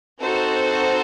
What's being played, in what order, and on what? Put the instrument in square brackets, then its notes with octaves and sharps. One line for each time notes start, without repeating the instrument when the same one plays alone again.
[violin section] C4 D#4 F#4 A4 C5